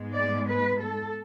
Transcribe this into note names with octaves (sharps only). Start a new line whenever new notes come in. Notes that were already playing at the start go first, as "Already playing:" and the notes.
Already playing: G#2 G#3 B3
D5
B4
A4